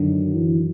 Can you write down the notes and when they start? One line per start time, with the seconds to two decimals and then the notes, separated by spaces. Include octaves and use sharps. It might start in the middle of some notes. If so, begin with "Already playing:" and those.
Already playing: F#2 D3 D#3 F#3
0.34 E3